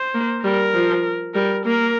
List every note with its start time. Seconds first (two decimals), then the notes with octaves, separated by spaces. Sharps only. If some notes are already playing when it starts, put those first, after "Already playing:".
Already playing: C5
0.14 A#3
0.44 G3 A#4
0.74 F3
1.35 G3 A#4
1.65 A#3 A#4